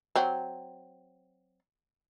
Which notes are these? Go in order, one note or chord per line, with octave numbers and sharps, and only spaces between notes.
F#3 C4